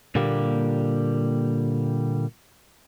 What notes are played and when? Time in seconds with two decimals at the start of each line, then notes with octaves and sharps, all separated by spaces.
0.15 A#2 D3 G3 A#3 G4